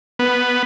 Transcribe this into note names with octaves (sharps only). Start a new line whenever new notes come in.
B3